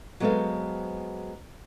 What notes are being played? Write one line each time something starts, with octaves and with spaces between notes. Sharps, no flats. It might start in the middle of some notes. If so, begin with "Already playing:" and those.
F#3 G#3 B3 A4 C5 F5